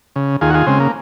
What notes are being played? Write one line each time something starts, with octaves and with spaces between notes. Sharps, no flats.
C#3
D#2 F4 G#4
F#4
F4 G#4
C#3 G#3 C4
A#3